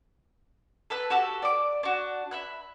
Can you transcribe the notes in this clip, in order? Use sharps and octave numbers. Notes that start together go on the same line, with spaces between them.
A4 B4 F#6
F#4 G4 A4
D5 D6
D4 F#4
E5 B5 F#6